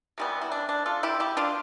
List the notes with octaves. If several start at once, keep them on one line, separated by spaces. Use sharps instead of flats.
C3 E3 G3 B3
E4
D4
D4
F4 A4
E4 G4
E4 G4
D4 F4